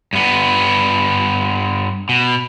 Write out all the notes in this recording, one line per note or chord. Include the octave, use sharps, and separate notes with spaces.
G2 B3
B2